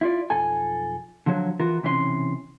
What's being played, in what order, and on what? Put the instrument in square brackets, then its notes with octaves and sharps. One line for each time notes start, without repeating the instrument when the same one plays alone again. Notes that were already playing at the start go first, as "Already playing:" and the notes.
[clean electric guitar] E4 F4 D5
B1 F2 A4 G#5
D3 F3 F#3 F#4 C#5
E3 F4 F#4 A#4
B1 C3 E3 C#4 B4 C6